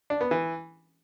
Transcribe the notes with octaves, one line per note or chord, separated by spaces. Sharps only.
D4
B3
E3